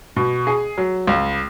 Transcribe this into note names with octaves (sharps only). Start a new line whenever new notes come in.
B2
G#4
F#3
C#2